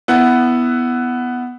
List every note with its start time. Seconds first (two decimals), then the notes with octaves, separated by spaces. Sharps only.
0.08 B3 E4 F#5